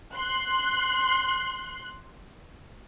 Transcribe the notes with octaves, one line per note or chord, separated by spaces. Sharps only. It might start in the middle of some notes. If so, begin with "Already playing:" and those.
C6 F#6